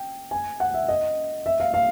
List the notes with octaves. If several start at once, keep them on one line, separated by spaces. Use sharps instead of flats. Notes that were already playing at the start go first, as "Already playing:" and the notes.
Already playing: G5
G#5
F#5
E5
D#5
E5
F5
F5